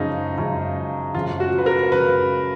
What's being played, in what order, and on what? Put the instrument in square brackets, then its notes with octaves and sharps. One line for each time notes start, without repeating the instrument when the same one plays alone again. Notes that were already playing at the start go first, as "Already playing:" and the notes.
Already playing: [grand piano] F#2 C#3 F3 G#3 [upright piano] D#4
[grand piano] F#2 C#3 F3 G#3
[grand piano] F#2 C#3 F3 G#3 [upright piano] F4
[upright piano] F#4
B4
A#4
[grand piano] F#2 C#3 F3 G#3 [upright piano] B4